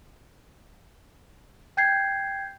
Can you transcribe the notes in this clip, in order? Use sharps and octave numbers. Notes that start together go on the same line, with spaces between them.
G5 G6 G#6 C7